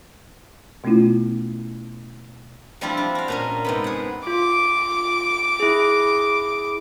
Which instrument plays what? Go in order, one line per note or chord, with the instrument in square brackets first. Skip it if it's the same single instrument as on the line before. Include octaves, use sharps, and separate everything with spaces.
[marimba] B2 A3 B3 C#4 E4 F4
[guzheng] F3 G3 C4 D4 E4 F4
F4
F#4 F5
A#2 C#4 A#4
G#2 C3 B3
G#4 F#5
[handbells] F4 [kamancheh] D6
[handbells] E4 G#4